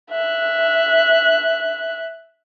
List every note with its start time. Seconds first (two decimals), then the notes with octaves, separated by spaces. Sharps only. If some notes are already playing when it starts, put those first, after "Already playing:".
0.11 E5 F#6